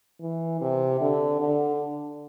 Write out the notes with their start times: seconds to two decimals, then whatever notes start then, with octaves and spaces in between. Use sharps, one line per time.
0.20 E3
0.61 C3
1.01 D3
1.40 D3